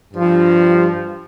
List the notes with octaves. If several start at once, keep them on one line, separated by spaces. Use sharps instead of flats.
G2 F3